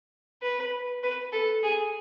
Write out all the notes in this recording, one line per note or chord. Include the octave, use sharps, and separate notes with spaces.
B4
B4
A4
G#4